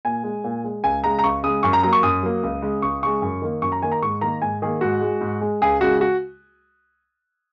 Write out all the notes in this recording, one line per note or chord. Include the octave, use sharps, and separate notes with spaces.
A#2 G#5
G#3
A#2
G#3
C#2 G#5
C#3 G#3 A#5
A#5
C#2 C#6
C#3 G#3 D#6
F#2 C#6
A#5
F#3 A#3 A#5
C#6
F#2 D#6
F#3 A#3
C#2
C#3 G#3
C#2 C#6
C#3 G#3 C#6
F#2
D#3 A#3
F#2 C#6
A#5
D#3 A#3 G#5
A#5
G#2 C#6
D#3 A#3 A#5
G#2 G#5
D#3 A#3 G#4
G#2 F#4
G#3
G#2
G#3
C#2 G#4
C#3 G#3 F#4
F#4